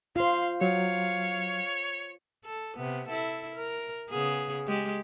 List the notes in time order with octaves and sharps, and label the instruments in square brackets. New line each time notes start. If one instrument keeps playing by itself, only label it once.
[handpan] F4 C5 [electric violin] F5 C6
[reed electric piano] F#3 [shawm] C#5 [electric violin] F5
[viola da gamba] A4
C3 B3
E4 A4
A#4
C#3 B3 G#4
G#3 G4